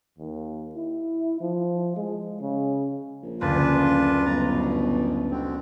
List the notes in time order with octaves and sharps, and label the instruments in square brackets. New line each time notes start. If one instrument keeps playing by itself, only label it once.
[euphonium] D#2
E4
F3
G#3
C#3
[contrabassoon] A#1
[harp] F#1 D2 A6 [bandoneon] D4 F4 B4
[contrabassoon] G1 [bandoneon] A#5 [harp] A6
[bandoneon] G2 B2
B2 D3 C4